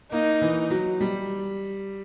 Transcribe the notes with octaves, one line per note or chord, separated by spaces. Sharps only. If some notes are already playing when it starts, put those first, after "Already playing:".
A#3 D#4
E3
F#3
G3